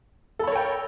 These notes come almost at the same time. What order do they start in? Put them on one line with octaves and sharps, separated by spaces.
A4 B5 C#5 A#4 G5